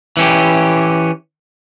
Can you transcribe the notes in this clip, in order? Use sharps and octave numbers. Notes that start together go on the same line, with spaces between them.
E3 C#4 G4